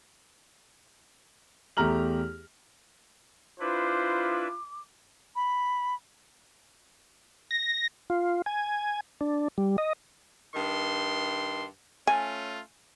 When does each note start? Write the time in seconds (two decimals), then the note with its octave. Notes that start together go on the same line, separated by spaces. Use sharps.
1.77 E2 A3 G4 A#5 F6 F#7
3.60 D4 E4 F4 B4 C5 D6
5.36 B5
7.51 A#6
8.10 F4
8.46 G#5
9.21 D4
9.58 G3
9.78 D#5
10.54 G2 D#3 C6
12.07 A3 C#4 F4 G#5